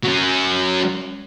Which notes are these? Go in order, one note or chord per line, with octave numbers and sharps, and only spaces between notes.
F#3 C#4